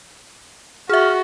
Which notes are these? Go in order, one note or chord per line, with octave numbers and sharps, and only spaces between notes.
F#4 G#4 E5 F6